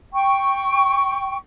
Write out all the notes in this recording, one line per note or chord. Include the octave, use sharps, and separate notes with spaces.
G5 C#6